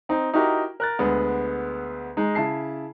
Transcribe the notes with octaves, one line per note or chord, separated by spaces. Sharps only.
C4 D#4
D#4 E4 F#4 G4 A#4
A#4 F#6 A6
D2 G#3 B3
G#3 D#4
C#3 E4 A5 C7